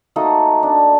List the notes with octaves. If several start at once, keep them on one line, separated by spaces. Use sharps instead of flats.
A3 A#3 D#4 F#4
D4